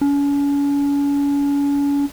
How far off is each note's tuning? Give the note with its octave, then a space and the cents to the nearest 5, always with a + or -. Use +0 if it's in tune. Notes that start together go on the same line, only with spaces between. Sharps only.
C#4 +40